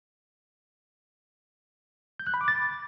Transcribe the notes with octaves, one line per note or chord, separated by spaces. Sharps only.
G6
F#6
B5
D6
A6